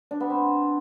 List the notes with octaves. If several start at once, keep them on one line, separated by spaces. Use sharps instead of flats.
D4
B3
C4